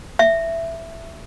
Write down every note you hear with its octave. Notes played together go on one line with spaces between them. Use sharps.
E5